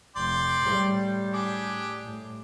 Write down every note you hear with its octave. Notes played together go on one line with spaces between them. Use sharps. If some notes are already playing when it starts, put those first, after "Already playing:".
F1 D5 G5 C6
A2 G3
D4 G4 G#4
A2